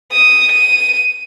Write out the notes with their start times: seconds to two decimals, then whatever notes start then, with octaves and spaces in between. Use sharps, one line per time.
0.12 D#6
0.52 D#7